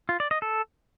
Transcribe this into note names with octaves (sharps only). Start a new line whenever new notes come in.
F4
D5
D#5
A4